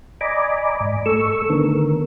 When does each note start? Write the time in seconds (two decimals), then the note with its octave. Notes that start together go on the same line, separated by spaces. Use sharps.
0.21 D5 D#5 G#5 A#5 B5 D6
0.80 G#2
1.06 A3 A4 C#6 E6
1.50 D3 D#3 B3 A#4